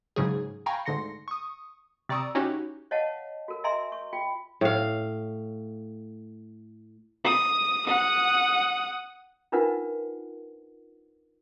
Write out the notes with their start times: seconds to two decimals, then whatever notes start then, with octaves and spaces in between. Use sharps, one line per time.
0.16 G#2 C#3 F#3 G#4
0.66 F5 G5 G#5 A#5 B5 C#6
0.85 D2 G#2 D3 C6 A#6 C#7
1.28 C#6 D#6
2.09 C3 D5 A#5 C#6 D#6 E6
2.35 C#4 D#4 E4 F#4 G4 C#5
2.91 C#5 D#5 F5 F#5 A5
3.48 F#4 A#4
3.64 D#5 E5 G#5 A#5 C6
3.92 C#6
4.13 F4 G5
4.61 A2 F5
7.25 D#6
7.86 F#5 D#6
9.52 D4 D#4 F4 A#4 B4 F#5